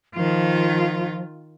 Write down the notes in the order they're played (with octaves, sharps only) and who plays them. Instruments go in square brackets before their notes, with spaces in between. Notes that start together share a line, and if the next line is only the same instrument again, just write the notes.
[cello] D#3 F4 [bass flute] F3